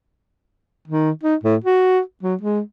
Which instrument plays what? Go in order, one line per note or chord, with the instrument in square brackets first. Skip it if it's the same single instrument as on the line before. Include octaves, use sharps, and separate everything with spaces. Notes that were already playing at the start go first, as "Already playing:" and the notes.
[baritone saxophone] D#3
D#4
A2
F#4
F#3
G#3